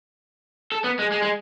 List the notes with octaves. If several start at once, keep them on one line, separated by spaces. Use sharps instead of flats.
A4
B3
G#3
G#3
G#3